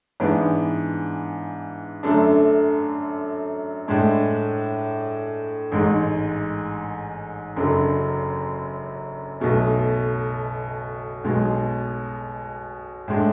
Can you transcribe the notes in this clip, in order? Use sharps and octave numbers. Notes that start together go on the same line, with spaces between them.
G#2 E3 B3 D4
F#2 D3 A3 D4
A2 G#3 D4
A1 G#2 G#3
F#1 F#2 D3 F#3
B1 B2 A3
B1 B2 G#3
A2 G#3 D4